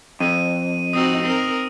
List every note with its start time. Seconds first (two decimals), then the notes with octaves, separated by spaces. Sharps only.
0.20 F2 D#7
0.93 C4 D#4 F#4 D#6 E6
1.22 C4 A#4